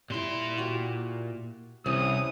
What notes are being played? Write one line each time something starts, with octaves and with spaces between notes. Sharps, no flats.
A#2 G3 E4 C6
F#4 G4
C2 C3 E3 C#4 D#6